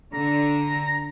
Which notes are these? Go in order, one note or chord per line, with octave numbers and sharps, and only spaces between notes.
D3 A#5